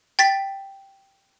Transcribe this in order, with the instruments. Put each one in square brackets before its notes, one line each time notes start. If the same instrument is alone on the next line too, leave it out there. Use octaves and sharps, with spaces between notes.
[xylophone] G5 A6 B6